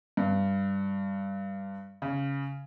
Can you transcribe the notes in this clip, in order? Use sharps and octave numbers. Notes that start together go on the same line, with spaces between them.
G2
C#3